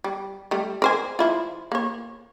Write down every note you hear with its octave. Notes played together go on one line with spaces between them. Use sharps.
G3
G3 A3
A#4 C5 G#5
F3 E4 F4
A#3 C#5